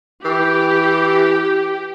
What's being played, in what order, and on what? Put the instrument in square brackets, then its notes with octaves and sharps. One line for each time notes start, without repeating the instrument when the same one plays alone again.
[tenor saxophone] E3 [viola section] G4